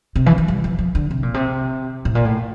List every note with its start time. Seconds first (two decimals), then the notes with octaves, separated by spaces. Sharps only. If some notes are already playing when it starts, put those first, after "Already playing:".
0.16 C3
0.26 E3
0.38 F3
0.48 G3
0.64 F3
0.79 F3
0.95 D3
1.11 C3
1.23 A#2
1.34 C3
2.05 A2
2.15 A#2
2.25 A2